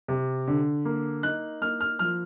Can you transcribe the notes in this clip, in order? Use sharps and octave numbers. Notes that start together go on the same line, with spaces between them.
C3
D3
A#3
D#4 F#6
A#3 F6
F6
F3 F6